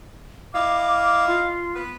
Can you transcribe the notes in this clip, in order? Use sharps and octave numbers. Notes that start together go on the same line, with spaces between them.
E4 D#5 F5 D6
D6
F4
B3 B4